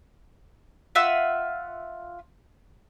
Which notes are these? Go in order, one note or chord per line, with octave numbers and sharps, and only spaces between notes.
F4 E5 F#5 E6